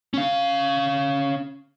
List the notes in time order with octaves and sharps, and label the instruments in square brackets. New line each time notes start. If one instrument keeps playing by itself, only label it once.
[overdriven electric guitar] C#4 F5